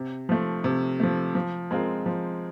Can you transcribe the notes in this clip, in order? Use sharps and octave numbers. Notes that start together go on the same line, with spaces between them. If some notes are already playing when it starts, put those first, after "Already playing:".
Already playing: C3
F3 A3
C3
F3 A3
F3
G#3 C4 F4 A#4
F3